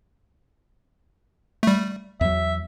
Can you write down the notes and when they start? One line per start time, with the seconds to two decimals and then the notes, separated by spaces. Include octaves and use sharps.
1.63 G3 A3
2.21 E2 F#3 E5